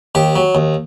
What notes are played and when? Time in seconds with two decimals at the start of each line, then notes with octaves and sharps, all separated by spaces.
0.15 D#2 G4
0.36 F#3
0.55 D#2